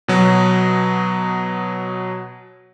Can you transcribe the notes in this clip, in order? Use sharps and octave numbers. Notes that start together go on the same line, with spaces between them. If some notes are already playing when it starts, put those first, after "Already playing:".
B2 F#3